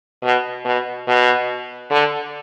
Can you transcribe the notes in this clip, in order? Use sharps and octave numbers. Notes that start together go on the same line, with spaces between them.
B2
B2
B2
D3